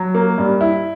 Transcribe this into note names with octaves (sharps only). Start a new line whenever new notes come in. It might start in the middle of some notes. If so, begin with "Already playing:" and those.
Already playing: F#3
A#3
G2
E4